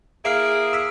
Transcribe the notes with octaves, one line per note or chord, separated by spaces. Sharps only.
A#3 E4 G#4 E5 F5 F6 C7 D7
E6 B6